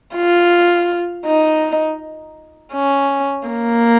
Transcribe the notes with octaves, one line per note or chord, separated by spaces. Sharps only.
F4
D#4
C#4
A#3